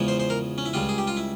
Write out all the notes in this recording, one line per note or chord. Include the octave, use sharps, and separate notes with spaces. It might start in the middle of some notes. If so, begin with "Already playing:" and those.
Already playing: E2 C#3 F3 G#3
C5
C5
A#4
C#4
E4
C#2 C#3 G3 F4
G#4
G4
F4
E4